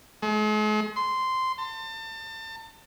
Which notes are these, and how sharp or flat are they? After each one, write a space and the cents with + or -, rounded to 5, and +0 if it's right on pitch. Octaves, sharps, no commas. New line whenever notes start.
G#3 +45
C6 -10
A5 +35